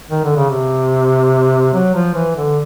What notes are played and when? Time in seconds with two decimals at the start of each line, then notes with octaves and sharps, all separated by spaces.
0.10 D#3
0.24 D3
0.37 C#3
0.50 C3
1.73 F#3
1.94 F3
2.15 E3
2.36 D3